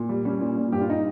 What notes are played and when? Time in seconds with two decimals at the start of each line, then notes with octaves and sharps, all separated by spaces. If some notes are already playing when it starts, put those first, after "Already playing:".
Already playing: A#2
0.09 G3
0.25 G3 C#4
0.41 A#2
0.57 A#2
0.72 G2 G4
0.81 F4
0.90 D#4